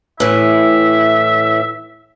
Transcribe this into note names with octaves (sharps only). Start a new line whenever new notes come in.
A2 E3 E5